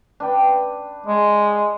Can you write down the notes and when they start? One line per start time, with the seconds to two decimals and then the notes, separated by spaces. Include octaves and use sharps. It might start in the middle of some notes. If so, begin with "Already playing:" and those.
0.20 D4 B4 G5
1.06 G#3